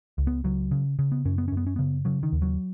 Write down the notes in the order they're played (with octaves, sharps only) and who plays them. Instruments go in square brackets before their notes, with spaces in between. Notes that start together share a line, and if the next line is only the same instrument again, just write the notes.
[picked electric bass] C#2
B3
C#2 F#3
C#3
C#3
B3
F#2 C#4
B3
C#4
F#2
B3
C#4
C#3 B3
C#3 F#3
D#3
D#2
F#3